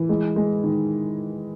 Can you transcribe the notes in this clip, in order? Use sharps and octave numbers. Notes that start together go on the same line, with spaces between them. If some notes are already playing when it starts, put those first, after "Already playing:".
Already playing: E3
G#3
G#3
D#3